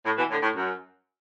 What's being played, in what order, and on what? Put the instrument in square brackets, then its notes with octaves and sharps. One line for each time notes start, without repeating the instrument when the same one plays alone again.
[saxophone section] A2
B2 E3
A2 D3
A2
F#2